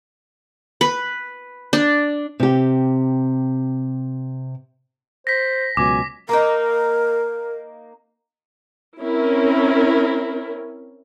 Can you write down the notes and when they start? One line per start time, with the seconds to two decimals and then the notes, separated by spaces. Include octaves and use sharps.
0.81 B4
1.73 D4
2.40 C3 G4
5.27 C5 A#6 B6
5.77 C#2 B2 F#3 G#5 D6
6.29 A#3 D#4 A#4
9.00 C4 C#4 E4 A#4